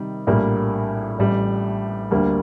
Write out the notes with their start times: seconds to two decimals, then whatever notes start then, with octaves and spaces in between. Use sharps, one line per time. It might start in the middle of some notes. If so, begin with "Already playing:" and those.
Already playing: C3 D#3 G3
0.27 A#1 A2 G3 A#3
1.19 A1 A2 G3
2.11 D2 D3 G3 A#3